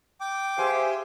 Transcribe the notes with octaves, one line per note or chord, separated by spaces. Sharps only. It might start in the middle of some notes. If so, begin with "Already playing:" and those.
G5 D6
G4 G#4 C5 E5 F5 G#5 C6